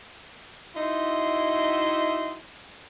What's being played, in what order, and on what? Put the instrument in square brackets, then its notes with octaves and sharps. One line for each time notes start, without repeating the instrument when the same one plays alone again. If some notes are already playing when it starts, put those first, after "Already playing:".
[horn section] D#4 E4 F#4 D#5 E5 C6